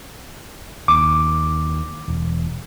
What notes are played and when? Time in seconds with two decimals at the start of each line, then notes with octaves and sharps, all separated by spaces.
0.88 D#2 D6
2.08 E1